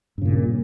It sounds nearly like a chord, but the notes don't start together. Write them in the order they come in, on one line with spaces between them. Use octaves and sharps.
G2 C#3 A#2